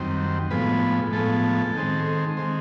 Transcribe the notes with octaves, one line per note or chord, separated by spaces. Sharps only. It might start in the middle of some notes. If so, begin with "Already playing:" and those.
Already playing: F#2 D#3 G3 C4
A2 F3 G#3 B3 B4
A2 F3 G#3 B3 A4
D#3 G#3 C4
D#3 G#3 C4